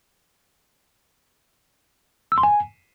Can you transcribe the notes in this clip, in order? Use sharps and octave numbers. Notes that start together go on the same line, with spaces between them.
E6
C6
G#5